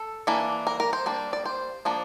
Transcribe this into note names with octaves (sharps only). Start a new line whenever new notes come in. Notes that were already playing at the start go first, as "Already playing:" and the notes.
Already playing: A4
E3 A#3 D4
A#4
A#4
C5
G3 A#3 D4
D5
C5
F3 A#3 D4